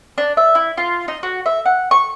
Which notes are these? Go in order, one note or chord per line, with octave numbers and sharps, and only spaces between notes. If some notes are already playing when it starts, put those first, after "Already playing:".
D4
E5
E4
F4
D#4
F#4
E5
F#5
C#6